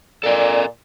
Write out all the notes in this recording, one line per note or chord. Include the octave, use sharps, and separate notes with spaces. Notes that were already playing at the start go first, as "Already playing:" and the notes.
A#2 A4 A#4 D5 D#5